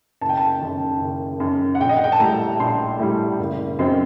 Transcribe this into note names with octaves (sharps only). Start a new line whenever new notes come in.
F#1 A5
G5
A5
F#2 D#3
F#1
F#2 D#3
F#5
A#1 G5
D#5
F#5
G5
A5
A2 G3 A#5
A#1 C6
A2 G3
F#1
F#2 F#3 C4 D#4